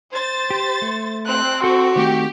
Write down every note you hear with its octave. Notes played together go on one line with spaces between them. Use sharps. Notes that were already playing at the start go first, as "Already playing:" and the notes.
C5 A6
G4
A3
C4 F#6
F#4 A4
D#3 A3 C4 G4